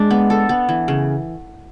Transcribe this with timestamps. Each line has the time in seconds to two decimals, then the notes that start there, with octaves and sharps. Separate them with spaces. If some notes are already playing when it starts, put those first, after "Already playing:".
Already playing: G#3 D4
0.11 B3
0.30 A4
0.49 B3
0.69 E3
0.88 C#3